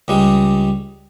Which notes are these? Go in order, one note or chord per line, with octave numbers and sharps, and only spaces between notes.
C#2 G3 G#3